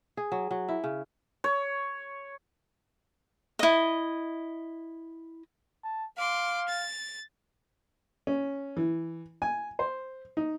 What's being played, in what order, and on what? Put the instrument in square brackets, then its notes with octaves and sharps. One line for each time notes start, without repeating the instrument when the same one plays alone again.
[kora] G#4
F#3
F#3
E4
C#3
[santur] C#5
[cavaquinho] E4 D#5
[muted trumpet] A5
[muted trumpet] F5 [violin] C6 D6
[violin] A6
[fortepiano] C#4
E3
G#5
C5
D#4